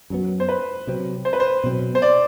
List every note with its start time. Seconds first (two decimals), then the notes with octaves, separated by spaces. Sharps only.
0.10 F#2 F#3 B3
0.40 C5
0.49 B4
0.87 C3 F#3 C4
1.25 C5
1.33 B4
1.40 C5
1.64 B2 F#3 C4
1.95 C5
2.02 D5